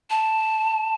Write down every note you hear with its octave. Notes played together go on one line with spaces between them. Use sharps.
A5